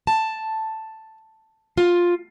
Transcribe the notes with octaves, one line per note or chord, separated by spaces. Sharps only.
A5
F4